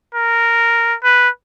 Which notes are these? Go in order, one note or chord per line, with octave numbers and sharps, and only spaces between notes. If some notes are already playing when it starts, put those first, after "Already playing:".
A#4
B4